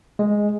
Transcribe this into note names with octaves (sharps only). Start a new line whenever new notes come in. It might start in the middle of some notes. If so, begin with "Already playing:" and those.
G#3